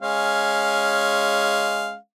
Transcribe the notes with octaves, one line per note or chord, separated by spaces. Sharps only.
G#3 C#4 F5